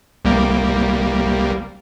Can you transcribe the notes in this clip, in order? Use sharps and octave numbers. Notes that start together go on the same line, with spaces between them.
C2 G3 A#3